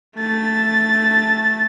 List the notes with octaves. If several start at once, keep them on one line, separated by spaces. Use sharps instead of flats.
A3 A6